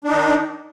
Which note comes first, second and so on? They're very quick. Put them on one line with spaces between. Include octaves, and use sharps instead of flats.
D4 D#4 D#3